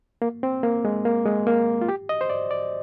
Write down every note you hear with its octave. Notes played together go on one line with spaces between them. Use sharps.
A#3
C4
A#3
G#3
A#3
G#3
A#3
F4
G4
D#5
C5
D5
D5